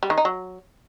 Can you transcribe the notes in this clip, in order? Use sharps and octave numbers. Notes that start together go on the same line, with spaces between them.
G3
D#3
D#4
F#3